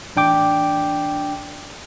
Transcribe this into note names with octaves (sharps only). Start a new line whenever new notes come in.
A1 D4 G5 D6